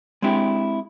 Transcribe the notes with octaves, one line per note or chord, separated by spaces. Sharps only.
G#3 C4 D4 E4 G4